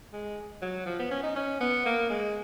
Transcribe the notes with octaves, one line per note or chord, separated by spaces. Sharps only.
G#3
F#3
F3
B3
C#4
D#4
C#4
B3
A#3
G#3